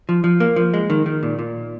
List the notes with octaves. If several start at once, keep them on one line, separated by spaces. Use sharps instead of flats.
F3
F3
A#3
F3
G#3
D#3
D#3
A#2
A#2